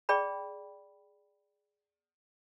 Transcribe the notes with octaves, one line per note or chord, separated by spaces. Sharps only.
G#4 D5 G5 B5